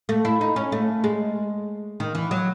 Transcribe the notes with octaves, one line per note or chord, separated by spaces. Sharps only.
A3
E4
D#4
C#4
A3
G#3
D#3
E3
F#3